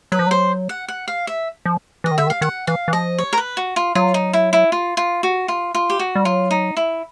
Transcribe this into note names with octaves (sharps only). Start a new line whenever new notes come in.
F#3 B4
F3
F#3 C5
F#5
F#5
F5
E5
F3
E3 D#5
D#3
D3 E5
D#3
F5
D#3 F#5
E3 F5
E3
F3 D#5
C#5
A#4
B4
F#4
F4
F#3 F4
D#4
E4
E4
F4
F4
F#4
F4
F4
G4
F#4
G3
F#3 F4
D#4
E4